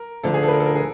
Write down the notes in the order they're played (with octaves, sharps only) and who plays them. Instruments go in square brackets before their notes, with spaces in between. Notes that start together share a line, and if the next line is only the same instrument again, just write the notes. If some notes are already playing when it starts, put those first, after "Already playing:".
Already playing: [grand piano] A#4
[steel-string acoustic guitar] D2 D3 F3 [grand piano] A4
[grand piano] G#4
A4 B4
A#4
A4
A#4
G#4